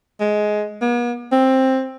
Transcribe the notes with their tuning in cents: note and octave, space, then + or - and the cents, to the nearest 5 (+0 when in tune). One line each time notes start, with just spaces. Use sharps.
G#3 +15
B3 -45
C4 +10